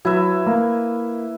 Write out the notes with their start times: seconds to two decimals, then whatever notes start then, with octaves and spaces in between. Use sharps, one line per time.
0.05 F#3 E4 B4 E5
0.46 A#3